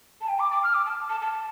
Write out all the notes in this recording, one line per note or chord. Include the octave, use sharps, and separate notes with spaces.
A5
G5
D6
D6
F6
D6
A5
A5
A5